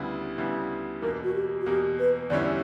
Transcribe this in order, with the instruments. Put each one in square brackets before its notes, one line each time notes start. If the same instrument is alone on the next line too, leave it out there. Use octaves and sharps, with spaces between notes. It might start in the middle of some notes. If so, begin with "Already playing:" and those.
Already playing: [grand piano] D2 C#3 G3 B3 E4
D2 C#3 G3 B3 E4
[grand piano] E2 B2 A#3 [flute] A#4
[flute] F#4
G4
F#4
[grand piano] E2 B2 A#3 [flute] G4
[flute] B4
[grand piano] E2 D3 G3 C#4 E4 [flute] D5